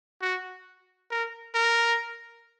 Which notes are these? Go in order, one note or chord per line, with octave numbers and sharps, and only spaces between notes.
F#4
A#4
A#4